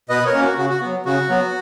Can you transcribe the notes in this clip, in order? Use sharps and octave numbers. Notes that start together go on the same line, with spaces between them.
B2 B4 D#5
A#4 C#5
A#3 C#4
F#4
C#3 F#4
F#4
F#3 B3
C#3 F#4
F#3 B3